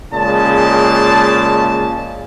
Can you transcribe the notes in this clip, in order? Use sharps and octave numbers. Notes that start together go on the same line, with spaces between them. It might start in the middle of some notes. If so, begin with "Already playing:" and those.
A#2 C#3 G#3 A5